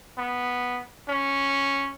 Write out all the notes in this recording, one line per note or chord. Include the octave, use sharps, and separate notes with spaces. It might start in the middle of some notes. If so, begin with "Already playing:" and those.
B3
C#4